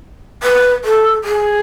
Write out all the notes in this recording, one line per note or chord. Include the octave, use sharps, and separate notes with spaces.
B4
A4
G#4